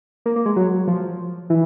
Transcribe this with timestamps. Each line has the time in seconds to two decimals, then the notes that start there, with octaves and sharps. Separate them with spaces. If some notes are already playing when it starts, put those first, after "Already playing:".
0.26 A#3
0.36 A#3
0.46 G#3
0.56 F#3
0.87 F3
1.50 E3